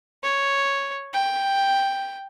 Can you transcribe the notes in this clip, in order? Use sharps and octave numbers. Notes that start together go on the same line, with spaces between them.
C#5
G5